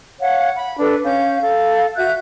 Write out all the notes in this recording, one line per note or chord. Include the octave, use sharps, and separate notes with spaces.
C#5 F5 F#5
B5
D4 A4 B4
C#4 F5 G6
A4 F5
F#4 E5 F#6 G6